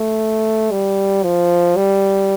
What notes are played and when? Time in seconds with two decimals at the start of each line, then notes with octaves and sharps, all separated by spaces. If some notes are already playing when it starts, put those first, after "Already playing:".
Already playing: A3
0.71 G3
1.23 F3
1.76 G3